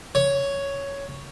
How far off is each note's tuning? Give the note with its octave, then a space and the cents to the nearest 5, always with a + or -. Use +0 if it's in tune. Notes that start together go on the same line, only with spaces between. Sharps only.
C#5 +5